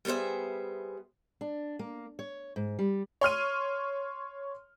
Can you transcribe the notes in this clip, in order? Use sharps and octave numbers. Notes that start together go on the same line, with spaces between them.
G3 B3 G#4 C5 E5
D4
A#3
C#5
G#2
G3
C#5 C6 F6 D#7